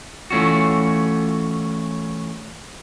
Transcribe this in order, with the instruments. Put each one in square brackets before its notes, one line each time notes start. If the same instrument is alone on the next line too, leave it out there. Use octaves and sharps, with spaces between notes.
[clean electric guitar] E3 A3 C#4 F4 F#4